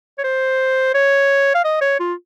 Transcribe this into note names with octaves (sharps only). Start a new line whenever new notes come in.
C#5
C5
C#5
F5
D#5
C#5
F4